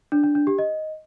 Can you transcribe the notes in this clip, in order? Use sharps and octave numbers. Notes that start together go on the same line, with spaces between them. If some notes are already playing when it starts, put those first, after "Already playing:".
D4
D4
D4
G4
D#5